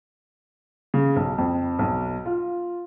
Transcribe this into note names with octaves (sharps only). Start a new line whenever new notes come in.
C#3
B1
F2
B1
F4